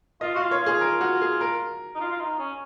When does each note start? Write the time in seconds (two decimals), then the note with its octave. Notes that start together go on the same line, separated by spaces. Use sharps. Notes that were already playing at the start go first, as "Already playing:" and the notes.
0.21 F4 D#5
0.35 F#4 F5
0.42 F4
0.51 C#5
0.61 F4
0.66 G#4
0.81 A#4
1.01 F#4
1.21 G#4
1.41 A#4
1.95 D#4
2.01 F4
2.11 F4
2.21 D#4
2.39 C#4